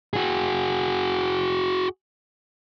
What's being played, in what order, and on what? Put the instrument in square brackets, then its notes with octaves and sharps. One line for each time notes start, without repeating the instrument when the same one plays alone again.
[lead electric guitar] F#4 G#4